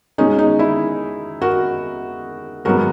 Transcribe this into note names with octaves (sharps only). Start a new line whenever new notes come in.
B2 G#3 C#4 D#4
D#4
E4
F#4 A#4
G#2 F#3 B3 F#4 A#4